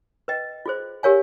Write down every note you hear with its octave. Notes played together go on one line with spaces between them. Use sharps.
B4 D#5 G5
F4 G#4 C5
G4 A#4 C#5 F5 G#5